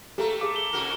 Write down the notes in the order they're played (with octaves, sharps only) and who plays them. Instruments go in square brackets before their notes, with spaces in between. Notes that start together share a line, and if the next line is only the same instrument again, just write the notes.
[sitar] A3 A#3 [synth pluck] G4 A4 A#5
[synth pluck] G#4 F5 [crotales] D6
[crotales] G7
[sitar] C3 F#4 A#4